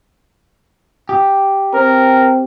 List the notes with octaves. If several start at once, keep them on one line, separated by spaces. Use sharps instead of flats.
G4
C4 A#4